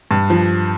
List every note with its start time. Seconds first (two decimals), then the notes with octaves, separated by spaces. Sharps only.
0.11 G2
0.30 F3